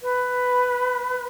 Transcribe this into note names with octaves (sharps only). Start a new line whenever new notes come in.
B4